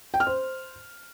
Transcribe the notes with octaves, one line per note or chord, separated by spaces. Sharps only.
G5
F6
C5